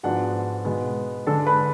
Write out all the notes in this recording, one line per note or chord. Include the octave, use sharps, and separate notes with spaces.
G#2 F3 G#3 B3 D4 F#4 F#5
B2 G#3 B3
D3 G#3 D4 A4 A5
B4 B5